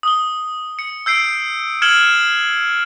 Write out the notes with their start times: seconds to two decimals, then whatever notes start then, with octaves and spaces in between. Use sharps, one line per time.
0.03 D#6 G7
0.79 C#7
1.06 E6 G6 C7 D7
1.82 F6 G#6 C#7 E7 F#7 G7